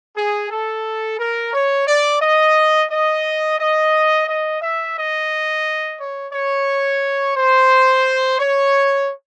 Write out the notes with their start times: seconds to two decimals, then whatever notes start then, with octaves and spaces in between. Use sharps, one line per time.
0.16 G#4
0.50 A4
1.19 A#4
1.53 C#5
1.87 D5
2.22 D#5
2.90 D#5
3.59 D#5
4.27 D#5
4.61 E5
4.96 D#5
5.99 C#5
6.33 C#5
7.36 C5
8.39 C#5